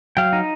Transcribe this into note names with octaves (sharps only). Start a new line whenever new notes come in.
F#3 F5 G5
D#4